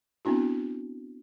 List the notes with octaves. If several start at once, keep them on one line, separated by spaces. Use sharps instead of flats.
B3 C4 D4 E4 F#4